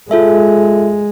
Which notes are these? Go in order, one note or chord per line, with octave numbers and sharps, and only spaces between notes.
G#3 F4 A4 E5